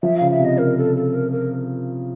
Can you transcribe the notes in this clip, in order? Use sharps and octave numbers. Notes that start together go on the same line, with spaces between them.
F3 E5
C#3 F5
E5
C3 D#5
A#4
A4
A4
A#4
A#4